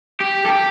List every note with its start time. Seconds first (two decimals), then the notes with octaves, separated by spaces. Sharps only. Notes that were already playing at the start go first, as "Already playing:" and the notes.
0.21 G4
0.46 A4
0.50 G4